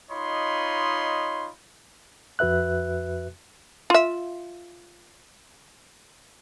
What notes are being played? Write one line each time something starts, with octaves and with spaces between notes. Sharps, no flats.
D#4 F4 C#5 D#5 B5 C6
F2 F#4 B4 E5 F#6
F4 E5